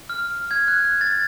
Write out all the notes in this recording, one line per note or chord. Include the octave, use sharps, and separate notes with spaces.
F6
G#6
F#6
A6